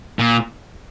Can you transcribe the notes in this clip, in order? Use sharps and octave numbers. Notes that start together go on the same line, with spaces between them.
A#2